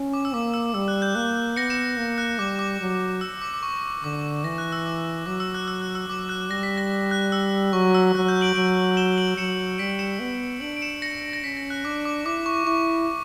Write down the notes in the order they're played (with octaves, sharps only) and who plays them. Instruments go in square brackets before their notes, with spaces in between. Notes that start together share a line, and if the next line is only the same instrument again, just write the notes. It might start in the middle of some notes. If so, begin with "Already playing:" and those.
Already playing: [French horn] C#4
[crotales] D6
E6
[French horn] A#3 [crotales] D6
[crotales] E6
[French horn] G3 [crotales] E6
[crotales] F#6
G6
[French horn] A#3 [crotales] F#6
[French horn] B3 [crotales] A#6 C#7
[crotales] C#7 E7
[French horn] A#3
[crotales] F#6
[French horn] G3 [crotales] D6
[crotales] D6
[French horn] F#3
[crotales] E6
D6
D6
C#6
[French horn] D3 [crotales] D6
[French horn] E3 [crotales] A#6
[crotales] F#6
E6
D6
[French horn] F#3 [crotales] D6
[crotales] E6
F#6
E6
F#6
E6
[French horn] F#3 [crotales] D6
[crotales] F#6
[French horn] G3 [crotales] A#6
[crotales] B6
A#6
F#6
E6
[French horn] F#3 [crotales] C#6
[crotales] E6
[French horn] F#3 [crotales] F#6
[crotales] G6
D7 F#7
[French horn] F#3 [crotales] D7 F#7
[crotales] E7 G7
D7 F#7
[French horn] F#3 [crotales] C#7 E7
[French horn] G3 [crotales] B6 D7
[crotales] C#7 E7
[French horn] B3
[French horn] D4 [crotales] D7 F#7
[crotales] D7
C#7 E7
A#6 C#7
A#6
[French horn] C#4 [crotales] B6
[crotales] A#6
F#6
[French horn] D4 [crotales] D6
[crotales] D6
[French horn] E4 [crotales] D6
[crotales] C#6
[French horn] E4 [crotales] C#6